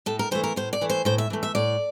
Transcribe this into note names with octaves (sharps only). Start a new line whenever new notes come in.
A2 A4
A#4
E3 A3 C5
A#4
A2 C5
D5
E3 A3
C5
A2 C5
E5
E3 A3
E5
A2 D5